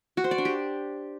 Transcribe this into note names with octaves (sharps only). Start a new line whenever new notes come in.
F#4
C5
D5
D4
G4